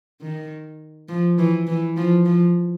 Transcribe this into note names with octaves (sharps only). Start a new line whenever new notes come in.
D#3
F3
E3
E3
F3
F3